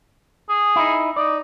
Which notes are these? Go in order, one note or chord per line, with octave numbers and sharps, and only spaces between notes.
G#4
D#4 E4
D#4 D5